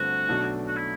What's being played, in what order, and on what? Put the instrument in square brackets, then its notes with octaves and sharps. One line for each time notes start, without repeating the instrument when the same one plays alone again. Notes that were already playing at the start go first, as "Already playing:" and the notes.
Already playing: [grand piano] G1 G2 D3 A3 C4 [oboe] F#4
[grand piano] B1 B2 A3 D4
[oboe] F#4
E4